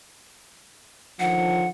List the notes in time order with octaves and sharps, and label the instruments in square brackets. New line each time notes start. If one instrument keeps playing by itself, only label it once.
[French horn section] D3 D#3 F3 [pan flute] F#5